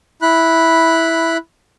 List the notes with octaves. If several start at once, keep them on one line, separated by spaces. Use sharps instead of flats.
E4 B5 F#6